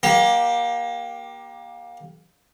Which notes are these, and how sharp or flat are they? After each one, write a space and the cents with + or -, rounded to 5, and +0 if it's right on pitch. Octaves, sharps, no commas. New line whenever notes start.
A#3 +25 G4 +0